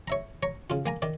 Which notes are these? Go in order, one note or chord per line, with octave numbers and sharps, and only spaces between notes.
C#5 E5 A#5
C#5 A#5
C#3 F4
A#3 G#5 A#5
D#3 D5